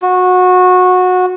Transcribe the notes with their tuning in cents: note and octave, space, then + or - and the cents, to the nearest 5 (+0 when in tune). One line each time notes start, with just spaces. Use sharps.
F#4 -20